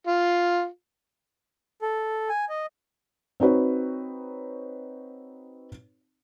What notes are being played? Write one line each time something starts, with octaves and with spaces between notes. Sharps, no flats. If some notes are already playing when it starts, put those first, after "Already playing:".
F4
A4
G#5
D#5
C4 D#4 F#4 B4 C#5